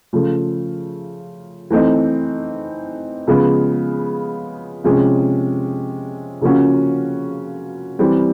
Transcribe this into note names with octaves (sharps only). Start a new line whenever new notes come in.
C#3 F3 A3
E3 A3 C4 D#4
C#3 F3 G#3 B3
C3 F3 G#3 C#4
C#3 F3 A#3 C#4 F#4
E3 G3 C4